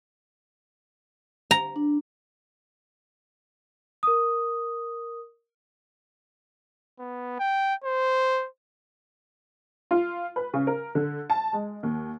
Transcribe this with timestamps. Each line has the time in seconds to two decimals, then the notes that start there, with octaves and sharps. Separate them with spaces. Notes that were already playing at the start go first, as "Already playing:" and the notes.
1.51 A#5
1.76 D4
4.03 A#4 D#6
6.99 B3
7.40 G5
7.84 C5
9.91 F4
10.36 B4
10.54 C#3
10.67 A#4
10.95 D3
11.30 A5
11.53 G#3
11.83 D#2